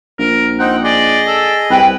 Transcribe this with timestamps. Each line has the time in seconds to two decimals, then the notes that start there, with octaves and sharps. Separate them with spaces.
0.19 A#1 A#4
0.59 C4 D#4 F#5 G5
0.84 G#4 D5 D#5
1.27 A4
1.70 C2 B4 G5